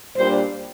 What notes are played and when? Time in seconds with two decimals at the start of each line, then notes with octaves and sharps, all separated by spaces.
0.17 A#2 G3 A#3 D4 C5